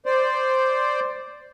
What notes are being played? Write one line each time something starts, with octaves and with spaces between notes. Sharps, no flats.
C5 D5